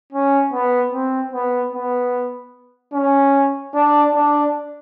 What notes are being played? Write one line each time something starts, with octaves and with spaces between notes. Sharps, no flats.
C#4
B3
C4
B3
B3
C#4
D4
D4